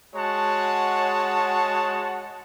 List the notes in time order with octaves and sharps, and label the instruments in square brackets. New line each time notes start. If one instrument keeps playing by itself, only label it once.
[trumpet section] G#3 F#4 C#5 F#5 A5